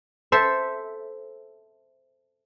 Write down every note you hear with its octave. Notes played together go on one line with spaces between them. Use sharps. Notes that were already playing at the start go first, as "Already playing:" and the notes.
A4 C5 E5